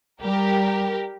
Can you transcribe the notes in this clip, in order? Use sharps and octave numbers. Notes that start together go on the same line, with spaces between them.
G3 G4 A#4